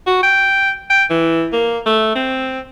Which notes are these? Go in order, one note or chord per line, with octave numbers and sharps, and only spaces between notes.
F#4
G5
G5
E3
A#3
A3
C4